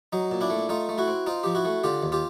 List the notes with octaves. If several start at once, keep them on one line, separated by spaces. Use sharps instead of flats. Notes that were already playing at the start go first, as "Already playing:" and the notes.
F#3 D#4
A#2
D4 E4
A3
A3 D#4 F4
A3
E4 F#4
C4
C4 D#4 F4
F3 G4
E4 F#4
A3
D3 F4 G4
D#2
F4 G4